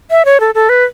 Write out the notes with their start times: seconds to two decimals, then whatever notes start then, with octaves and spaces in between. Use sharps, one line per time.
0.11 E5
0.25 C#5
0.40 A4
0.55 A4
0.69 B4